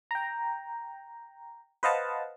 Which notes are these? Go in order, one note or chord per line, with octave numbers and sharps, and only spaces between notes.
G5 A#5
B4 C5 D#5 F5 F#5 A5